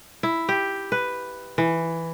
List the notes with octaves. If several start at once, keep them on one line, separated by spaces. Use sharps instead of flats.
E4
G4
B4
E3